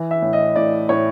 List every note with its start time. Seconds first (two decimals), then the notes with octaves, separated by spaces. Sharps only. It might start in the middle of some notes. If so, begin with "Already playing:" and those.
Already playing: E3
0.11 E5
0.22 A2
0.33 D#5
0.56 A2 D5
0.89 A2 C#5